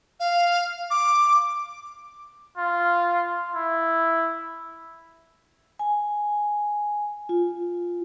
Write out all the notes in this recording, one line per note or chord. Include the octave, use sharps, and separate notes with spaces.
F5
D6
F4
E4
G#5
F4